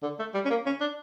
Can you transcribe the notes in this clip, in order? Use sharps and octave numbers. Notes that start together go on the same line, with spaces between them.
D3
A3
G3
C#4
A#3
C#4
D4